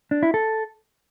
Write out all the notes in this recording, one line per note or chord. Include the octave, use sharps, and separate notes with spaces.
D4
E4
A4